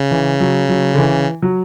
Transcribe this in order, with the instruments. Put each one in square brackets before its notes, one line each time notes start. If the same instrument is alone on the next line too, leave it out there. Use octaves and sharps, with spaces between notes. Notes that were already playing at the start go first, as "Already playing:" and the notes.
Already playing: [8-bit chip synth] C#3
[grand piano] E3
F#3
F#3
D3
E3
F#3